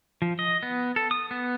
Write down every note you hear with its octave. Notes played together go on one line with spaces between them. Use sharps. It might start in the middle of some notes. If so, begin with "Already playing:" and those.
F3
D#5
B3
A4
D#6
B3